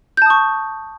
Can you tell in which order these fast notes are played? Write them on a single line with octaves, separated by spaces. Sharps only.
G6 A5 D#6 C#6